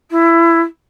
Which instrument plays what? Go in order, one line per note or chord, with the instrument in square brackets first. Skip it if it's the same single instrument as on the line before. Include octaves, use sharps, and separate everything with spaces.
[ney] E4